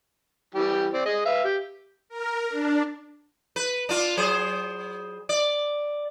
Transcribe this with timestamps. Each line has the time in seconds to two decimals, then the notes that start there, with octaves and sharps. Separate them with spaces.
0.55 E3 G3 G4
0.93 C4 D5
1.06 G#4 D#5
1.26 B4 E5 F5
1.44 G4
2.09 A#4
2.50 D4
3.56 B4
3.89 D4 F4
4.17 F#3 G#4 C5
5.29 D5